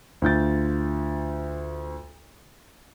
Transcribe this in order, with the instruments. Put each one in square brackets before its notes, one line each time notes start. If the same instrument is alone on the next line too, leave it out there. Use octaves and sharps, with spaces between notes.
[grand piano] D2 F4 G6 A6